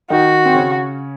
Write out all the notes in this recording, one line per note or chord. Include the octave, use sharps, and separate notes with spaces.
D#3 D#4 F#4
C4
C#3 C#4